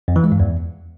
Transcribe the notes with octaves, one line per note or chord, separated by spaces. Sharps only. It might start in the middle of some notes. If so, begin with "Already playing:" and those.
F2
E3
G#3
G2
E2